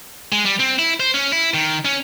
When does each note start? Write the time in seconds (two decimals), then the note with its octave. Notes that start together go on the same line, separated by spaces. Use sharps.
0.32 G#3
0.45 G3
0.60 C4
0.79 E4
1.00 C5
1.14 C#4
1.32 E4
1.54 D#3
1.85 C#4